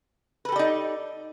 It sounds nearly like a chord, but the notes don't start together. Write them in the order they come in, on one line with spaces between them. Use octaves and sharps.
B4 A4 G4 D5 D#4